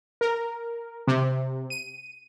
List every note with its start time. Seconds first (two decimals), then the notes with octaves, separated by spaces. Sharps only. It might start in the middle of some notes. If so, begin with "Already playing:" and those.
0.21 A#4
1.07 C3
1.70 D#7